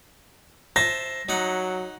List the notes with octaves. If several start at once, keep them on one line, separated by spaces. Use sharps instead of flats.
C5 E5 A5 A#6
F#3 D#4 F#5